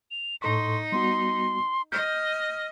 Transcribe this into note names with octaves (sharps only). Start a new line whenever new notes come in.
F7
A2 D#4 A4 C6 C#6
G3 B3 F#4 C6
D#5 F6 G6